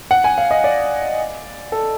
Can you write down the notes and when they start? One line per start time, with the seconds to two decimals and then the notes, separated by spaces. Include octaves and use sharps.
0.11 F#5
0.24 G#5
0.38 F5
0.51 D#5
0.64 D5
1.72 A4